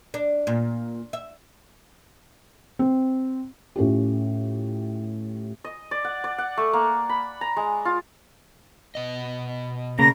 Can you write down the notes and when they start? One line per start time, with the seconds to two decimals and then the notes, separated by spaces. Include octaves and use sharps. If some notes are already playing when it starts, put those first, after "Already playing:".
0.14 D4
0.47 A#2
1.13 E5
2.79 C4
3.76 A2 C#4 F4 G4
5.64 D#5
5.91 D5
6.05 F#5
6.24 D5
6.38 F#5
6.57 A3
6.73 A#3
7.09 B5
7.41 A#5
7.56 G#3
7.85 F4
8.95 B2 D#5
9.99 C#3 A#3 A#5 A#6